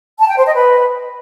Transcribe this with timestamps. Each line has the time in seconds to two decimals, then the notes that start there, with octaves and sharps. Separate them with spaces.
0.19 A5
0.28 G5
0.37 C5
0.45 D#5
0.54 B4